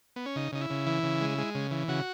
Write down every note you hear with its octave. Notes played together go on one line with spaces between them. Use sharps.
B3
C#4
C#3 D#4
C#3 D#4
E4
C#3
E3
C#3
G#3
G#3
C#3
E3
C#3 F#4